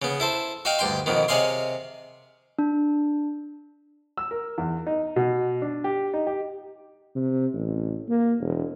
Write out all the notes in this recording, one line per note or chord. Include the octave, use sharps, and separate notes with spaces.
C#3 B3
E4 A4 C5
F#4 D#5 F5 G5
D2 G2 G5 C6
F2 B2 D#3
C3 G#4 C#5 D#5 F5 C6
D4
E6
A#4
E2
D#4
B2
D4
G4
D#4
G4
C3
A1
A#3
E1